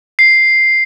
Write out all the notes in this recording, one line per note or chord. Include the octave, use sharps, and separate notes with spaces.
C7